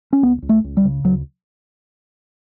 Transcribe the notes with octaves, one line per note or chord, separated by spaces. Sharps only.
C#4
C#2 B3
C#2
A3
C#2
G3
C#3
D2 F#3